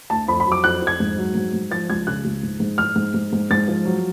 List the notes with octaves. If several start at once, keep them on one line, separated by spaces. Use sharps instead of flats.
D2 A5
F2 B5
B5
F#3
D6
F2 F#6
F2
G#6
G#2
F#3
G#2
G#2
F3 A6
C#2 G#6
C#3 F#6
C#2
G#2
G#2
G#2 F6
G#2
G#2
G#2
G#2 A6
F3
F#3